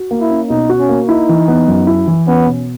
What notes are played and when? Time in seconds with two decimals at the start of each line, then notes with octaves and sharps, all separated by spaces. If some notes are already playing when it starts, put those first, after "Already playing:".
Already playing: F#4
0.11 A#3
0.21 E4
0.30 C#4
0.50 B2 D#4
0.70 F#4
0.79 C#4
0.89 A#3
1.08 D#4 E4
1.29 E3
1.48 B3
1.68 F#2
1.87 E4
2.08 E3
2.27 B3 C#4
2.47 B2